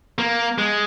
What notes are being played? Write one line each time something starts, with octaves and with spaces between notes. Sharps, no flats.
A#3
G#3